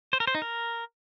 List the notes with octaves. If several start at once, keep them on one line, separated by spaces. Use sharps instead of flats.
C5
A#4
C5
D#4
A#4